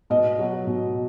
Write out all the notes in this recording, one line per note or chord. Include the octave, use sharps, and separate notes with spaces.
B2 D#5
F#3
B2